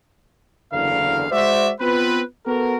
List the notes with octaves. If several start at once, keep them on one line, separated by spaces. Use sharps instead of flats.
F#1 E2 D3 A#4 F5
G#3 F#4 C5 D5 E5
B3 C4 F4 B4
B3 F#4 A4 A#4